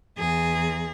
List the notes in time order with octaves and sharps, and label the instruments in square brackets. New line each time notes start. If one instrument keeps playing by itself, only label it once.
[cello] E2 G#4